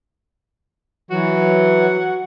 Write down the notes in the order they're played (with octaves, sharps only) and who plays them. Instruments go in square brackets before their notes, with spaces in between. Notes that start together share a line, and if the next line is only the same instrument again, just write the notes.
[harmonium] E3 F#3 [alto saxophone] F#4